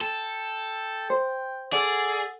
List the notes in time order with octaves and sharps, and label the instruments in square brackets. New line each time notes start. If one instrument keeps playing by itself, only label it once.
[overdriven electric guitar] A4 [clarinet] G5
[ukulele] C5
[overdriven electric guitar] G#4 [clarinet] A4 [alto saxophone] D5 [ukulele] F#5